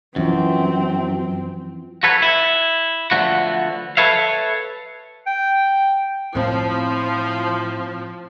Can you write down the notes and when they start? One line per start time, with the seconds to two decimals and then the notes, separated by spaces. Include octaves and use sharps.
0.16 F#2 E3 F3 C4
2.03 F#4 A4 B4 C#5
2.22 E4
3.11 D3 F3 A3 B3 F#4
3.97 A4 B4 C#5 E5 F5
5.27 G5
6.35 A2 F3 C4